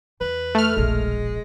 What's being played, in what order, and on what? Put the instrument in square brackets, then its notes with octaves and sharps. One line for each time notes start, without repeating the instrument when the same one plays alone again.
[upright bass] E2 [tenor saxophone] B4
[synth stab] A3 F6
[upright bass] E1 A#1 [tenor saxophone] G#3